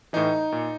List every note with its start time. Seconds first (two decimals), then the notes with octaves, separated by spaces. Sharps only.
0.13 A2 E3 D#4
0.52 A#2